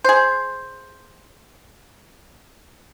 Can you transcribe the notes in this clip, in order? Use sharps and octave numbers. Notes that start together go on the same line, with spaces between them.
G#4 C5